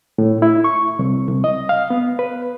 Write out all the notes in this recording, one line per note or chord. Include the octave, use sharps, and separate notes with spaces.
A2
E4
C#6
C2
C2
D#5
F5
B3
B4